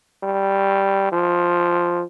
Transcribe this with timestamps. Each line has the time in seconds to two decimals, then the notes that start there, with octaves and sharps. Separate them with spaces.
0.24 G3
1.12 F3